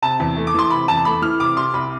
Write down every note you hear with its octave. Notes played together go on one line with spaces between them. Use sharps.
C3 A5
E2
A3
D6
E3 C6
C3 B5
E2 A5
A3 B5
E3 F6
C3 D6
C2 C6
C2 B5